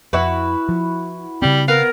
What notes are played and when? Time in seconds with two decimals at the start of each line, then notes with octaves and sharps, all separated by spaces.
0.13 F2 E4 F#4 B4
0.69 F3
1.42 C#3 G3 C4
1.68 B3 A#4 F5